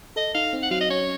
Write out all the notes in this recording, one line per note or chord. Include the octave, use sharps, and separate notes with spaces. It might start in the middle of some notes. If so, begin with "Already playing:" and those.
A4 D#5
D#4 F5
C4
F#5
F#3 F5
D#5
C#4 C#5